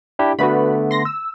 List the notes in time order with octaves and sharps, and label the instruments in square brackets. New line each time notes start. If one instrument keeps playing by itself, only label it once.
[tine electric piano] D4 E4 G4
[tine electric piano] D3 A3 B3 [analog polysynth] F#4 B4 B5
[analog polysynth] C6 A#6
E6